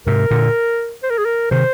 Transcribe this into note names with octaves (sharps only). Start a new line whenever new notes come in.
G#2 C3 A#4
A#2 D3
C5
A#4
G#4
A#4
C3 D#3 C5